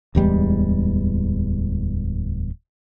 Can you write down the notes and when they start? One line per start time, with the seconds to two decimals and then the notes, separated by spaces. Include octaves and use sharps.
0.15 D1 E2 G3 G#3